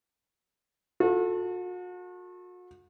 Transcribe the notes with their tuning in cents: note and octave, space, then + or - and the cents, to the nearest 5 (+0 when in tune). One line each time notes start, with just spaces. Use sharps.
F#4 -40 A4 +5